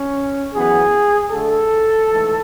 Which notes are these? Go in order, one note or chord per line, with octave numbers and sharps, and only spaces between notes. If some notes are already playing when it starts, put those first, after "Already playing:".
Already playing: C#4
F#2 E3 B3 G#4
D2 D3 A3 A4
G#2 E3 A3